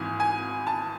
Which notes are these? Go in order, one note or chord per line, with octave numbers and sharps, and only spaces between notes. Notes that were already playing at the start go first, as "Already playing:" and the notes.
Already playing: G#1 G#2 E3 G#5
G#5
A5